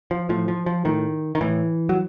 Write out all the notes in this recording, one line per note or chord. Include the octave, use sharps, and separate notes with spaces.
F3
A2 F3
F3
F3
A2 D#3
D#3
A2 E3
F#3